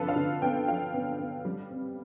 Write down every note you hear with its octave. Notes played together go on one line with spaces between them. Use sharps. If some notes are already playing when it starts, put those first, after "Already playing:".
Already playing: D3 F3 F4 A4 B4
F5
D3
B3 G5
F3 F5
B3
B3
G3
C4